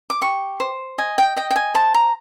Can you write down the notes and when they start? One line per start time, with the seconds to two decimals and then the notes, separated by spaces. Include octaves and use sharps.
0.10 D6
0.21 G4 C#6
0.60 C5
0.98 D#5 G#5
1.18 G5
1.36 D#5 G5
1.51 G5
1.56 G#5
1.74 C5 A5
1.94 A#5